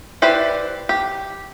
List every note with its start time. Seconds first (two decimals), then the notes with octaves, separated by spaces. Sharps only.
0.22 E4 G4 B4 C5 D5
0.89 G4